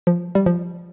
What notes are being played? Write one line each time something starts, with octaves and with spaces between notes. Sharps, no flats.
F3
G3
F3